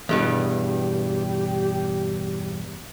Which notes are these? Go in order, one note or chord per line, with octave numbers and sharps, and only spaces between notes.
E2 G2 B2 G4